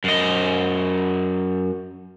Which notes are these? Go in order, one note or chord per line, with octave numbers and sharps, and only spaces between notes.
F#2 D#5